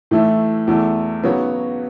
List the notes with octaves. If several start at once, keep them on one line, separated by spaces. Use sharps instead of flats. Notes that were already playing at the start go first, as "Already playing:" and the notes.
A2 E3 A3 E4
E2 E3 A3
C#3 F#3 B3 F#4 C#5